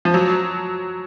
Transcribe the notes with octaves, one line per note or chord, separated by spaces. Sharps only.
F3
F#3